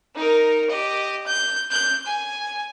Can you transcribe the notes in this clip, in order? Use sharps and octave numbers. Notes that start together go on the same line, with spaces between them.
D#4 A#4
G4 D#5
G6
G6
G#5